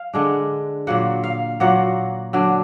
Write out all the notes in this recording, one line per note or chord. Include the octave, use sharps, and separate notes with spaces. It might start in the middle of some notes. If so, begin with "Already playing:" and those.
Already playing: F5
D3 G#3 D4
A#2 F#3 A#3 F#5
F5
A#2 F#3 A#3 F#5
D3 F#3 D4